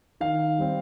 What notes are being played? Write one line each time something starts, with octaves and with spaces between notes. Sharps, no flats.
D#3 F5
G3 C4